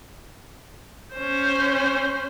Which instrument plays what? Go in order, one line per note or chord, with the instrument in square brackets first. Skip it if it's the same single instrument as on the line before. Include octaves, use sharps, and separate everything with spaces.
[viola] C#4 C5